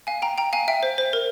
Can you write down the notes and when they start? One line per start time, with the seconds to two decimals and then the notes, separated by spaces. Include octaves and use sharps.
0.07 F5 G#5
0.22 G5 A#5
0.38 G5 A#5
0.53 F5 G#5
0.68 E5 G5
0.83 C5
0.98 C5
1.13 A#4